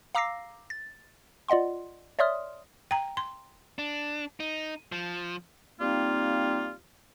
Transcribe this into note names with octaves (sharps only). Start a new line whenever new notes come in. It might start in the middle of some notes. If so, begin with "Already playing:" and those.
F5 A#5 D6 E6 A#6 C7
A6
F4 D5 D#5 F#5 C6
C#5 D5 E5 C6 D#6 F6
G5 A#5
C6
D4
D#4
F3
G3 A#3 C4 D#4 F4